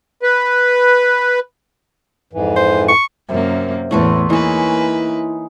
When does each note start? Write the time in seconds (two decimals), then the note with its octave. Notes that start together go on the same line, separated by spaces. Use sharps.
0.23 B4
2.33 F2 G#2 E3
2.56 C5
2.88 C#6
3.29 F#2 C3 A#3
3.91 E2 A2 E4 A4 B4 C#5 C6
4.30 E3 A#3 D#4 G#4 B4 C#5 E5